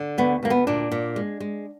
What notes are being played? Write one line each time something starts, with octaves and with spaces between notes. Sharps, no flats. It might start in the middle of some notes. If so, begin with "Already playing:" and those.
Already playing: D3
D2 B3
D2 A#3
B3
A#2 D4
A#2
G#3
G#3